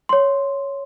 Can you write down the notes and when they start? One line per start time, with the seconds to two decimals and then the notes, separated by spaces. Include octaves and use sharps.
0.09 C#5 C6